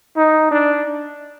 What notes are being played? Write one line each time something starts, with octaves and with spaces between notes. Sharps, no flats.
D#4
D4